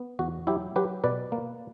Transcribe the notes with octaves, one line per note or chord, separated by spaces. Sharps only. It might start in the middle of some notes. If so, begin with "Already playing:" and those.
Already playing: B3
E2 F#4
F#3 E4 G4
F#3 G4 B4
B2 B4 D5
A#3